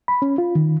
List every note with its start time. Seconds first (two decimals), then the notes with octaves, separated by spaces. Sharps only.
0.08 B5
0.22 C#4
0.38 F4
0.55 D#3